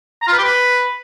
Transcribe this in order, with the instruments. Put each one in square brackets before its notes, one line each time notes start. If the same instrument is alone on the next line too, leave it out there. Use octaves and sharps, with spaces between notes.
[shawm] A#5
F4
B4
G4
B4